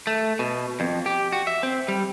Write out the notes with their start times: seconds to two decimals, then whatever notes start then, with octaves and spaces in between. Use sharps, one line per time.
0.07 A3
0.39 B2
0.80 F2
1.06 G4
1.32 F#4
1.47 E5
1.63 C4
1.88 G3